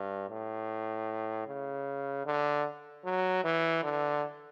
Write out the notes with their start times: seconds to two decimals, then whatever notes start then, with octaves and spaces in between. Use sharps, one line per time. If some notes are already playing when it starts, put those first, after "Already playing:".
Already playing: G2
0.29 A2
1.47 C#3
2.25 D3
3.04 F#3
3.44 E3
3.83 D3